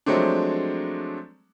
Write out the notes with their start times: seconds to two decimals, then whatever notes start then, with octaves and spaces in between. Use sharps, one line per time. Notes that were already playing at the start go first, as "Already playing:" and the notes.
0.06 F3 F#3 G#3 A3 C4 D4